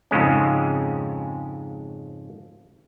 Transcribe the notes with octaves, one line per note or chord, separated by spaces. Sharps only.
F2 G#2 C#3 G#3 C#4